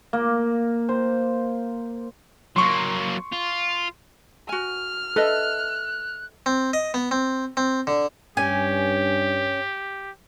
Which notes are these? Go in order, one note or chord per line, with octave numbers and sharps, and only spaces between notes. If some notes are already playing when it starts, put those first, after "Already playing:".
A#3
C5
F#3 A#3 C6 C#6
F4
F#4 G#5 F6
A4 B4 D#5 E5 F#6
C4
D#5
B3
C4
C4
D3
G2 C#4 G4 G#5